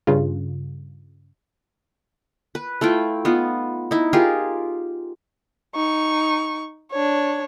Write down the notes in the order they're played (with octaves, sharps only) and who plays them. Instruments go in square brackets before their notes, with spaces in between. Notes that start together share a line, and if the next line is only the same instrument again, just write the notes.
[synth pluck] G2 C#3 F4
[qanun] B4
A3 E4 F4 G5
B3 D#4 F4
D#4 E4
F4 G4 G#4 A#4
[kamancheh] D#4 C#6
D4 C#5